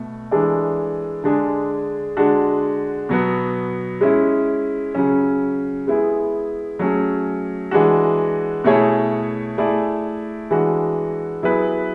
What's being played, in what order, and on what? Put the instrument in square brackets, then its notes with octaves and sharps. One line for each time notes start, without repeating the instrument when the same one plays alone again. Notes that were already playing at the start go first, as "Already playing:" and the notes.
Already playing: [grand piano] B2 A3
E3 G#3 D4 A4 D5
D3 G#3 D4 G#4
D3 G#3 D4 F#4
B2 F#3 B3
G#3 C#4 E4
C#3 F#3 C#4
G#3 B3 E4 G#4
F#3 A3 C#4 G#4
E3 G#3 D4 F#4
B2 A3 E4 G#4 C#5
A3 E4 G#4 D5
E3 G#3 D4 F#4
F#3 B3 E4 G#4 B4